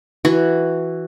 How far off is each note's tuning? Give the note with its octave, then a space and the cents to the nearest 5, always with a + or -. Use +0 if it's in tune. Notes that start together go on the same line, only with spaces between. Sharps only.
E3 +0 F#4 +5